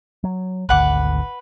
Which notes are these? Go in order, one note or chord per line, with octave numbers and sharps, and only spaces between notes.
F#3
G#1 D2 D3 B4 F#5 D6